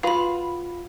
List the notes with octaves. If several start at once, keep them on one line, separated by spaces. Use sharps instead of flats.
F4 F#4 B4 F5 B5